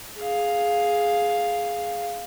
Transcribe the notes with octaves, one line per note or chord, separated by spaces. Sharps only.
G#4 F5